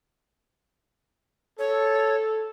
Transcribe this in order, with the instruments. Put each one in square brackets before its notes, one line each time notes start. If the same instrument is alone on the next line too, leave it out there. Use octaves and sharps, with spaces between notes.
[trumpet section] A4 [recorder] C#5